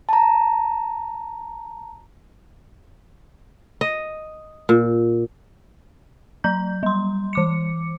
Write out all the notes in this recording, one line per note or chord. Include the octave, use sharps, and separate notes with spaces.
A5 A#5
D#5
A#2
F#3 A#5 G6
G3 C6
E3 D6 C#7